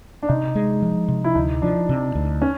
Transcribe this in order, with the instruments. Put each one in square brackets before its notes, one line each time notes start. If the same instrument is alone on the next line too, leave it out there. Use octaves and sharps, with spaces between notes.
[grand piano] D4
[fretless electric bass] C3 [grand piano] D#4
[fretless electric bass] G#3
F3
C3
[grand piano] E4
[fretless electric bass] D2 [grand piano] D#4
[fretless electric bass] F3 [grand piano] D4
[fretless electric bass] C3
D2
[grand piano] C#4